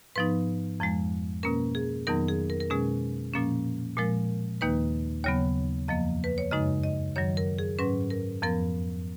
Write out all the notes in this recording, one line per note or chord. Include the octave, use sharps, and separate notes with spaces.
G#2 F3 B3 D#4 B4
F2 F3 G#3
B2 A#3 C#4 A#4
G#4
F2 D#3 F#3 B3 D#4 A#4
G#4
A#4
A#4
B2 G#3 C#4 G#4
A#2 F3 A#3 C#4
A#2 F3 G#3 A#4
D#2 D#3 A#3 D#4 B4
D#2 C#3 F#3 B3 C#5
F2 F3 A#3 D#5
B4
C#5
F#2 C#3 G#3 D#4 D#5
D#5
F#2 D#3 F#3 C#5
A#4
G#4
G#2 F#3 C#4 B4
A#4
F2 F3 B3 A#4